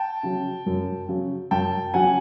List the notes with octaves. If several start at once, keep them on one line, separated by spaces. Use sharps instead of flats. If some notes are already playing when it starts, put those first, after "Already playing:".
Already playing: G5 A5
C#3 F#3
F#2
C#3 F#3
F#2 G5 A5
C#3 F#3 F#5 G#5